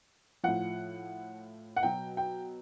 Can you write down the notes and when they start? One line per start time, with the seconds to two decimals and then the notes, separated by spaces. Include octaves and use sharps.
0.43 A2 F3 F#5
1.76 F#5
1.83 B2 F#3 G5
2.17 G5